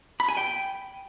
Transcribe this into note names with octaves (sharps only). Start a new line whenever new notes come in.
B5
G#5
G5